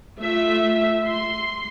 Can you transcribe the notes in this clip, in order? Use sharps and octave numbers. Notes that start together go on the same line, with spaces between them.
A3 F4 E5
C6